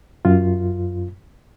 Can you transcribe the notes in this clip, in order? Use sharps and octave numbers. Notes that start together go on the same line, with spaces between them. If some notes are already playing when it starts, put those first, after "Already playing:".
F#2 F4